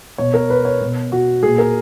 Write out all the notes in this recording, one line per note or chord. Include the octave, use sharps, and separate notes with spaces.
B2 C#5
A#4
B4
C#5
B2
F#4
A#2 G#4
A#4